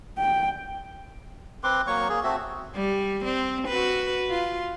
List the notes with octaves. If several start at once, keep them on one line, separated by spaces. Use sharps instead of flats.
G5
C4 B4 C6 D6
F#3 A#3 C#5 C#6
A#3 G#4
A3 C4 F#4 E5
G3
C4
F#4 B4
F4